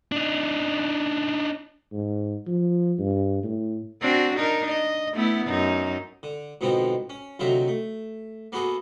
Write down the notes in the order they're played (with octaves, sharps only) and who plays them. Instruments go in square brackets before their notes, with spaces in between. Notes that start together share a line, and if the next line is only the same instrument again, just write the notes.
[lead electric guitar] D4 D#4
[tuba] G#2
F3
G2
A2
[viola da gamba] C4 D4 F#4
D4 D#4 A#4
D#5
A3 B3 E4
F#2 D#4
[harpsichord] D3
G#2 B2 D3 F3 C4 D#4
C#4
D2 C3 F#3 D#4 F4 E5
A3
A#3 B3 F#4 G#4 A4